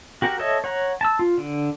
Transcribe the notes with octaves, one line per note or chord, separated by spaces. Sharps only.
F#4 G4 A#4 F#5
A4 C#5 D#5 E5
C#5 F#5 A#5
A5 E6
F4
D3